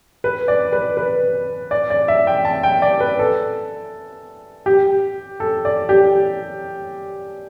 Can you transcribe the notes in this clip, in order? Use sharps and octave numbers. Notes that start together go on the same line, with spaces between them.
B4
D5
B4
B4
D5
D5
E5
G5
A5
G5
D5
B4
A4
G4
A4
D5
G4